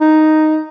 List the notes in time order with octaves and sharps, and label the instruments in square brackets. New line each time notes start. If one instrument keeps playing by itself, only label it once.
[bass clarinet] D#4